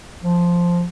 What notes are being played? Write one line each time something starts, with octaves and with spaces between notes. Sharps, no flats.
F3